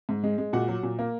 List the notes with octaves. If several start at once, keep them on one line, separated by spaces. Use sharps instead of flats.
G#2
G#3
G#3
A#2 F#4 F#5
F#3
A#2
A#3